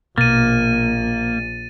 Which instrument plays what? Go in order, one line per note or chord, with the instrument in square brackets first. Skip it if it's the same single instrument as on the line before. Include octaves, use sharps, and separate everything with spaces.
[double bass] A#1 [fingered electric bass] B2 [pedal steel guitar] A#3 [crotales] A6 D#7